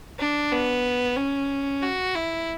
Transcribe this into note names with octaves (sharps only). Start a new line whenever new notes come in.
D4
B3
C#4
F#4
E4